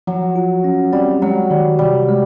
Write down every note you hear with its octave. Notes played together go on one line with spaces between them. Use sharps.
F3 F#3
F4
C#4
G3 C4
F#3 G#3
D#3 G3
C3 G3
G#3